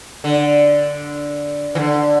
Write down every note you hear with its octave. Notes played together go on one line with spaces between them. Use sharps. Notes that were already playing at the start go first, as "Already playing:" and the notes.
D3
E3
D3